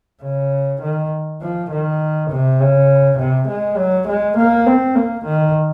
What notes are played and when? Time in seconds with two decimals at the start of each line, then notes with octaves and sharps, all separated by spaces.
0.22 C#3
0.81 D#3
1.41 F3
1.70 D#3
2.30 C3
2.60 C#3
3.18 C3
3.48 G#3
3.77 F#3
4.08 G#3
4.37 A#3
4.66 C4
4.95 A#3
5.25 D#3